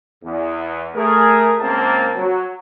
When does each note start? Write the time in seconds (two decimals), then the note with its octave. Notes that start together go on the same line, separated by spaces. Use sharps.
0.24 E2
0.95 A3 G#4 A#4
1.61 C#2 A#3 C4 A5
2.16 F#3